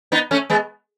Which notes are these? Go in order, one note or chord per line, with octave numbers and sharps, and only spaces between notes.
B3 D#4
A3 C#4
G#3 B3